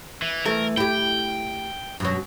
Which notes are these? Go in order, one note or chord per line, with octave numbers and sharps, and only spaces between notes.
E3
E3 A3 A#4
E4 G4 G5
F#2 B2 F#3